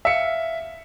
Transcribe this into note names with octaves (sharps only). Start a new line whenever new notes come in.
E5 F5 C#7